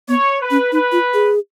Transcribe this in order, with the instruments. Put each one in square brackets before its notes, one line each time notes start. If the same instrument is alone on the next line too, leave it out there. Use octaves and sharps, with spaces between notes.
[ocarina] B3 [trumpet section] C#5
[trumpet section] B4
[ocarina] C#4
[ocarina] D#4 [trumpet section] B4
[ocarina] F4
G#4